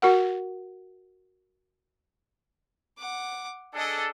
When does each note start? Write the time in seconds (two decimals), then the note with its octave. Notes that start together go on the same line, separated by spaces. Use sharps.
0.02 F#4 A#4 F#5
2.99 F#5 D6
3.74 D4 G#4 A4 D#5